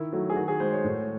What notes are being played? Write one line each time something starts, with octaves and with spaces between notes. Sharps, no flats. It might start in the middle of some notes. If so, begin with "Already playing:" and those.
Already playing: D#3 E4
F#3 A3
G#4
D#3 F#4
G#4
G#3 C5
C#5
A2